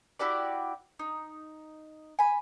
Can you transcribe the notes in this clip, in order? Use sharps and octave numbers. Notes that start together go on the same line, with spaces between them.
E4 F#4 G4 D5
D#4
G#5 B5